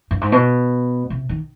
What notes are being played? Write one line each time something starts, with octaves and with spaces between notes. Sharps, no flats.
G2
G#2
B2
C3
D#3